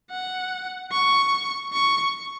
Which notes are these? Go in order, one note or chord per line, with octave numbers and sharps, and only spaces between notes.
F#5
C#6
C#6